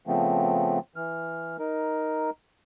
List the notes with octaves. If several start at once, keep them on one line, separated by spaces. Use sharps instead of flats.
C#3 F3 A3 B3 C4
E3 F6
D#4 A#4